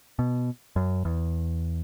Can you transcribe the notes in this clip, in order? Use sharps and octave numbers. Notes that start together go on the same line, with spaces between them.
B2
F#2
E2